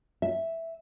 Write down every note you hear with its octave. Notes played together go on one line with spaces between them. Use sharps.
E5